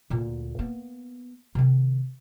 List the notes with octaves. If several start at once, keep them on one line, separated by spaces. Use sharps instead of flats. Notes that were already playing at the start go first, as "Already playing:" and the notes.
D2 A#2
A#3 B3
C3 D#3